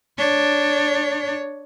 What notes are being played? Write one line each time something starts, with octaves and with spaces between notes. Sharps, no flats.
D4 C#5